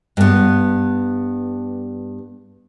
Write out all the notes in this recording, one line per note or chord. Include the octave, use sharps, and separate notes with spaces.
G2 B3